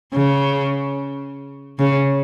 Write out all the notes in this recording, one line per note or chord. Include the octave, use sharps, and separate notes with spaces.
C#3
C#3